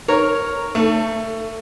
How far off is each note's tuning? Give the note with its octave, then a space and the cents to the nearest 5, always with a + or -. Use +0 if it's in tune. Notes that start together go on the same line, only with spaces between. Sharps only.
A#4 +0 C#5 +0 A#5 -10
A3 +25 A4 +0